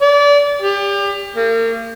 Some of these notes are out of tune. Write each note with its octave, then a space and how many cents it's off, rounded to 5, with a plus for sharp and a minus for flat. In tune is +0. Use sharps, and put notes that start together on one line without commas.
D5 -30
G4 +30
A#3 -40